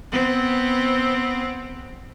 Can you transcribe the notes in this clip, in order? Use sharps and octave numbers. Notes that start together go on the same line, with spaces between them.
B3 C4